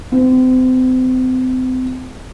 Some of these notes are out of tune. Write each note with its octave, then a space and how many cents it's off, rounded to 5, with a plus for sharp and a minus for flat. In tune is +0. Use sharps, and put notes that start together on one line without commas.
C4 -35